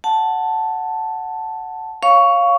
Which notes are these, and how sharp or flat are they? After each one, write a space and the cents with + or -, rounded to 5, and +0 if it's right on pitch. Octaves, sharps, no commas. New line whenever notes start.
F#5 +0 A5 +0
C#5 +0 F5 +0 C#6 +15